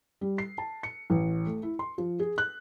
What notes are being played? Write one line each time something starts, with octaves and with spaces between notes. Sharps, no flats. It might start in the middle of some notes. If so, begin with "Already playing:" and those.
G3
C7
A5
C#7
A1
A3
E4
C6
F3
G#4
F#6